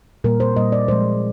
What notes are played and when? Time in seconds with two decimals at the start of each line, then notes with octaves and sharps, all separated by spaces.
0.24 A#2 G3 A#3 A#4
0.40 C5
0.56 A#2 G3 A#3 D#5
0.72 D5
0.88 A#2 F3 G#3 C5